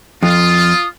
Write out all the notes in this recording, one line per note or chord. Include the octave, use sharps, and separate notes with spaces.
F2 F4 D#6